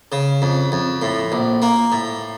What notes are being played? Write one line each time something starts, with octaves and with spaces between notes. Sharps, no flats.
C#3
F2
F2
A2
A#1
A#3
A2